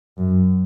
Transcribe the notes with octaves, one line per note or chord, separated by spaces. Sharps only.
F#2